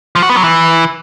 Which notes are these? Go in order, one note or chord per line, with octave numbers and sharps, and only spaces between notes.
F3
F#4
B3
F#3
E3